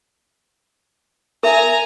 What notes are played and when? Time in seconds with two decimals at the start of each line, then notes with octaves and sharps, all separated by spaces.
1.43 A#4 E5 G#5 A#5